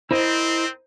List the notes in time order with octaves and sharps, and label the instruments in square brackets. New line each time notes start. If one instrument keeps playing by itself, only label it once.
[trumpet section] C4 [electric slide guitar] E4 A#4 D#5 [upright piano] C5